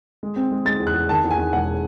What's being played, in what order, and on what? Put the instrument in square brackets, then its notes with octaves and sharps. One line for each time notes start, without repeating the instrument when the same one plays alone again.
[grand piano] G#3
C4
G#3
G#3 A6
E2
F#6
E2
D#3 A5
E2
G#5
E2
E1 F#5